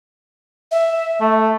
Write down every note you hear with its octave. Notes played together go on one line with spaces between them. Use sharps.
E5
A3